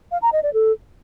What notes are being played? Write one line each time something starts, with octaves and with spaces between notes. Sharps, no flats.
F5
A#5
D#5
D5
A4